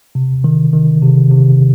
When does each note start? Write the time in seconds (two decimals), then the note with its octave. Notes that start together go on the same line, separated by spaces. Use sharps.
0.15 C3
0.44 D#3
0.73 D#3
1.02 C3
1.32 C3